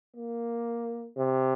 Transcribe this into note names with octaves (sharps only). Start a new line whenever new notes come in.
A#3
C3